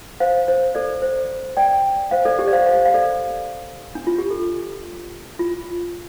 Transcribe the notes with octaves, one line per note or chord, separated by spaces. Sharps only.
C5 F5
C5
A4 D5
C5
D5 G5
C5 F5
A4 D5
G4
D5
C5 F5
C5 F5
F5
A4 D5
D4
F4
G4
A4
F4